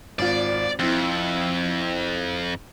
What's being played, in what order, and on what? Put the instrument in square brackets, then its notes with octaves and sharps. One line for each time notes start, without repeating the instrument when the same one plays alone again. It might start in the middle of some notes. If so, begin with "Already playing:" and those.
[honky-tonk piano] G#1 F4 [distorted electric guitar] D5
[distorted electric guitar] F2 [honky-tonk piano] C4 E4